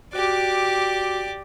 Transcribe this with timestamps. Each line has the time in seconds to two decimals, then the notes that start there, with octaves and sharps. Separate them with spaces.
0.13 F#4 G4 D5